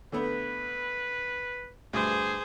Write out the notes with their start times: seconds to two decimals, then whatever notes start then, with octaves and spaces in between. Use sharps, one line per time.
0.12 D3 A3 B3 B4
1.93 D2 G2 G#4 C5